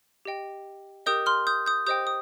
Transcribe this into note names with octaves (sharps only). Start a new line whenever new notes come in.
G4 D#5 G5
G4 A#4 D#5 G5 D#6 G6
C6 F6
D#6 G6
D#6 G6
G4 C5 D#5 G5 D#6 G6
D#6